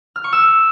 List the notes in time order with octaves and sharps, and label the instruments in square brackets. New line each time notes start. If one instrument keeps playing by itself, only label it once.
[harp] F6
C#6
E6